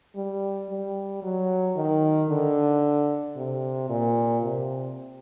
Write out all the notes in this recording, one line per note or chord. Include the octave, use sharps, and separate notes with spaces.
G3
G3
F#3
D#3
D3
C3
A#2
C3